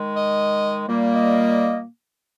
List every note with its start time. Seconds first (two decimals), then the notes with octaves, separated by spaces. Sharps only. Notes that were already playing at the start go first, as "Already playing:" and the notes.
Already playing: D#3 G#3
0.14 D#5
0.88 A#2 G3 A#3
1.14 D#5